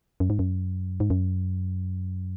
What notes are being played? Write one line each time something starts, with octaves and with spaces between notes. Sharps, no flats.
F#2
G#2
F#2
G#2
F#2